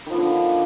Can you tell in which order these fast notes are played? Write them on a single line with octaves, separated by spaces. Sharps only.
D#3 F3 B3 D3